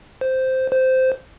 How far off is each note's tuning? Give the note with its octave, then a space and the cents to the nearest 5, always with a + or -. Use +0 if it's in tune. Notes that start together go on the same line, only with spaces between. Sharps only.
C5 -5
C5 -10